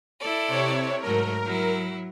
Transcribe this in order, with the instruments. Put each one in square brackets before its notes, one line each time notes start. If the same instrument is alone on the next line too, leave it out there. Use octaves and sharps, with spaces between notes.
[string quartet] E4 A4 D5
[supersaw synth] C3 C#5
[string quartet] G#2 F#3 A3 [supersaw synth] A#4
[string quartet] F#3 E4